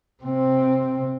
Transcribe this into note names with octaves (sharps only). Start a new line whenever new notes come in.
C3 C4